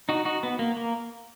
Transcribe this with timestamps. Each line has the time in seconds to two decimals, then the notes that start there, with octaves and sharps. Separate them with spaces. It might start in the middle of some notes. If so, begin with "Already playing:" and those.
0.09 D#4 F#4
0.25 D#4 F#4
0.43 B3
0.59 A#3
0.77 A#3